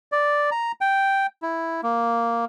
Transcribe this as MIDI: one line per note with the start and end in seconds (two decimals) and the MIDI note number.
0.12 0.50 74
0.51 0.72 82
0.81 1.26 79
1.42 1.81 64
1.83 2.45 58